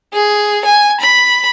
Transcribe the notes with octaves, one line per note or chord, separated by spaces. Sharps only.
G#4
G#5
B5